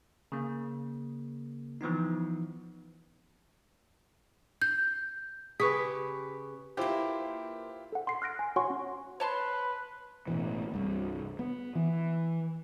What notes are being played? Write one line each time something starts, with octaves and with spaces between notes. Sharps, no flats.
C#3 A#3
E3 F3 B3 D#4
G6
C#3 G4 G#4 B4 C#6 B6
A#3 E4 F4 G4 C5
A4 F#5
C6 C7
F6 F#6 A#6 D7
G#5
F#4 C#5 F#5 G#5 C6 C#6
C#4
B4 C#5 A5 C6
A1 B2 E3
C2 G2
B3
E3